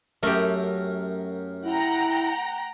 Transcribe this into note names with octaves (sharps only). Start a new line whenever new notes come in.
F#2 A3 G4 A#4
E4 F#5 G5 A#5